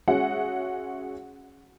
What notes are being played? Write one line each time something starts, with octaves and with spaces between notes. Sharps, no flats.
G#3 C#4 F#4 G#4 E5 F#5